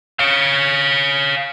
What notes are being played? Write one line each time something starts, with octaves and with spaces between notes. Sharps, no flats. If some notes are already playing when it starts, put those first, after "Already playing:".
C#5 F5